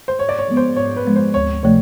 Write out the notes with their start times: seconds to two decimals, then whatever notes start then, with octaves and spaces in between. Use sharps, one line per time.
0.08 C5
0.19 G#2 C#5
0.29 D5
0.39 C#5
0.48 F3 G#3 B3
0.57 C5
0.76 G#2 C#5
0.97 B4
1.05 F3 G#3 B3
1.16 C5
1.34 D2 C#5
1.63 C3 F3 A3 C#5